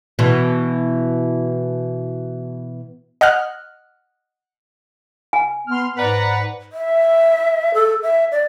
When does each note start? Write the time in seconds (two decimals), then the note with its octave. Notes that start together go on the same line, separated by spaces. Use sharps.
0.19 B2 E3
3.21 D#5 F#5 F6 F#6
5.33 G#5
5.67 B3 C6 F6
5.97 G#2 B4 D5 F#5 A#5
6.72 E5
7.74 A4
8.03 E5
8.32 D5